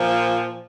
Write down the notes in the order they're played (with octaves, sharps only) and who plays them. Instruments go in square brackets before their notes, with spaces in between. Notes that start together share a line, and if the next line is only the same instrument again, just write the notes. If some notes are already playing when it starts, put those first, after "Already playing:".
Already playing: [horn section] A#2 F3